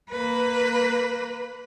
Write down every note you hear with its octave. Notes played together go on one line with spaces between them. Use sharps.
A#3 B4